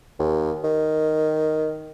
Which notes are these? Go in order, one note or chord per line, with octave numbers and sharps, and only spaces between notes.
D#2
D#3